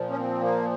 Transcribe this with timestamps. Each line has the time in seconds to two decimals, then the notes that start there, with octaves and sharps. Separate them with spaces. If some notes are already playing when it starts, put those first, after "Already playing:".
Already playing: A#2 F3
0.10 C#4
0.17 C4
0.41 A#3